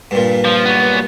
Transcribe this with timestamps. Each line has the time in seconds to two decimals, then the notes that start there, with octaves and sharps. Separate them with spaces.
0.11 G2 A#2
0.45 F3
0.66 F#3 B3